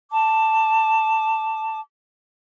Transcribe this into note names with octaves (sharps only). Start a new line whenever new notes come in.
A5 D6